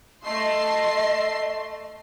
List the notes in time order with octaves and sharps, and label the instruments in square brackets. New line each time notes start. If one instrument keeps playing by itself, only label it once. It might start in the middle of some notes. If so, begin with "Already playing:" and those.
[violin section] A3 C6 C7 [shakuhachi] D#5